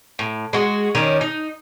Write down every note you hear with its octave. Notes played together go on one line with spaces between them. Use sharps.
A2
G#3 F#4
D#3 C#4 D4 D#5
D#4